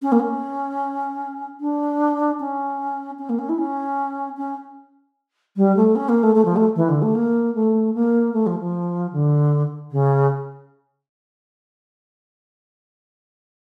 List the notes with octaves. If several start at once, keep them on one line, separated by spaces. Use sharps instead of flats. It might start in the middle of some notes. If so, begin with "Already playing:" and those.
C#4
A#3
C#4
D4
C#4
C#4
A#3
C#4
E4
C#4
C#4
G3
A3
C#4
A#3
A3
A3
F3
A3
E3
D3
A3
A#3
A3
A#3
A3
F3
F3
D3
C#3